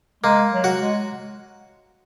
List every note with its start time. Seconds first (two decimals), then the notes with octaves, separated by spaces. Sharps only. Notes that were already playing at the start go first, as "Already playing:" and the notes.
0.24 G#3 A#3
0.51 F#3
0.64 F#4
0.78 G#3